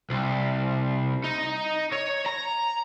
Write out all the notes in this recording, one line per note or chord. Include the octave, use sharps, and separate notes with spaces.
C2
D#4
C#5
A#5